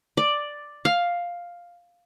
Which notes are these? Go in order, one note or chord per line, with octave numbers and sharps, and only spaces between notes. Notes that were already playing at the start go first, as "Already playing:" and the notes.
D5
F5